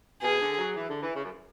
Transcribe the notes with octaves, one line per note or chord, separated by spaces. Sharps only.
B2 G#4
D3
F#3
E3
D3
E3
C#3
F#2